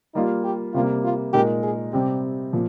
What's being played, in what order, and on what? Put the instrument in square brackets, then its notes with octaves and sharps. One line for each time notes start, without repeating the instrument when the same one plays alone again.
[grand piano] G3 A#3 F4 [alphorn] D#4
[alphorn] G4
[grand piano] C3 G3 A#3 [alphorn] F4
[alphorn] F4
[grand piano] A#2 G#3 D#4 A#4 [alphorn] G4
[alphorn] G#4
[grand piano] C3 G3 C4 [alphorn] G4
[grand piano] A#2 F3